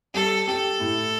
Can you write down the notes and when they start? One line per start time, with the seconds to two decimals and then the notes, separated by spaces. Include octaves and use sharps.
0.14 G3 A4
0.47 G4 A4
0.80 A2